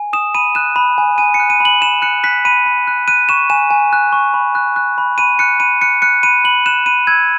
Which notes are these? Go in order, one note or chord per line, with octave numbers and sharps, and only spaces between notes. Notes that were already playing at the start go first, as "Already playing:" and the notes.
Already playing: G#5
D#6 E7
B5 D#7
F#6 E7
B5
G#5
G#5 D#7
C#7
F#6
D#7
B5 F#7
B5 E7
F#6 C#7
F#6 B6
B5 D#7
B5
F#6
F#6 D#7
C#6 E7
G#5 E7
G#5
F#6
C#6
B5
F#6
F#6
B5
B5 D#7
F#6 C#7
B5 D#7
F#6 C#7
F#6 C#7
B5 D#7
B5 F#7
F#6 E7
B5 D#7
E6 G#6